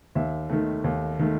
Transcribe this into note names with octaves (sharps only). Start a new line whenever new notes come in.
D#2 E5
D#3 A3
D#2
D#3 A3